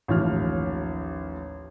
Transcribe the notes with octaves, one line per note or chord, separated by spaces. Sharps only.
A1 D#2 F3 F6